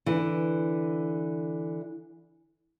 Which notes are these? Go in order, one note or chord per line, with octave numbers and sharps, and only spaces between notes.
D3 E3